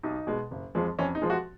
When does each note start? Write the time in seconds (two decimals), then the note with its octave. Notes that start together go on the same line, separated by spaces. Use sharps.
0.03 B1 D#4
0.27 B2 G#3
0.51 F#1
0.75 F2 F3 G#3
0.99 F2 C#4
1.15 D#4
1.22 F3 G#3
1.30 F#4